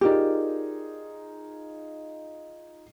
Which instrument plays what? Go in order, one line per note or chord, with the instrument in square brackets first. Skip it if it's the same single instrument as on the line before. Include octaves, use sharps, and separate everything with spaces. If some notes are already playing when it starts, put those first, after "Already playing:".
[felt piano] D#4 F4 G#4 [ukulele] G4 A#4 D5